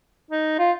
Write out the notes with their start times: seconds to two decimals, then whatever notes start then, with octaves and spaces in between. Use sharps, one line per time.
0.31 D#4
0.59 F4